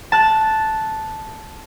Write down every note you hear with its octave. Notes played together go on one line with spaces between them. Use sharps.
A5 F#6